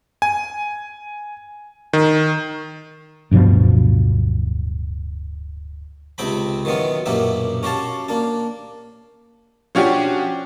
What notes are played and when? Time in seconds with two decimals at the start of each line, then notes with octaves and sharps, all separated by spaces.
0.22 G#5
1.93 D#3
3.31 D1 G2 B2 F3
6.18 C#2 C3 C4 G5 B5
6.65 D#3 E3 F#3 B3 F4
7.06 A#1 F#2 B2 A#3 G4 E5
7.63 C#4 F#4 G4 F5 A5
8.09 A#3 D4
9.75 F3 C#4 D4 F#4 G4